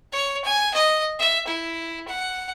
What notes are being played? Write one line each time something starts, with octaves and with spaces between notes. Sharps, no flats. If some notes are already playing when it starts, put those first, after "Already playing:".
C#5
G#5
D#5
E5
E4
F#5